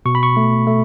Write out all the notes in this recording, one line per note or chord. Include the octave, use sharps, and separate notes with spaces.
B2 C#6
B5
C#6
A3
A3